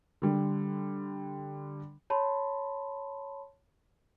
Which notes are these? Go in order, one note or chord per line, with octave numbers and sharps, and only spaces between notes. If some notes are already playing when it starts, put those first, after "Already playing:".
D3 G3
C#5 A5 B5 C6